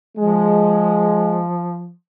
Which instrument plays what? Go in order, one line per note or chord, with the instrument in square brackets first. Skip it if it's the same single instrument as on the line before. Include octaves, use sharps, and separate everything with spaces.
[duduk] F3 [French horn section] G#3